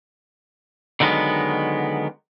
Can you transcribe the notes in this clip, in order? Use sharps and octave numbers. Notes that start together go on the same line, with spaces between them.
D3 D#3 F#3 G#3 B3